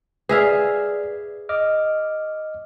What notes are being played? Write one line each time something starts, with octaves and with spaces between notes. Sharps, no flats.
G#4 B4 D5 E5 F5
D#5 D6 F6